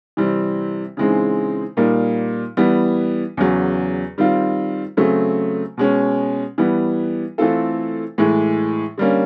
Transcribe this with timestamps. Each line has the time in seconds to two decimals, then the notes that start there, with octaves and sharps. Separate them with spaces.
0.17 C3 E3 G3 C4
0.97 C#3 E3 G#3 C4 D#4
1.77 A#2 G3 A#3 D#4
2.57 E3 G3 B3
3.37 E2 C#3 F#3
4.18 D#3 G3 C4 F4
4.97 C#3 F#3 A3 C4
5.77 B2 G#3 C#4
6.58 E3 G3 B3
7.38 E3 A3 C4 F4 A4
8.18 A2 E3 G#3
8.98 D3 G3 A#3 C#4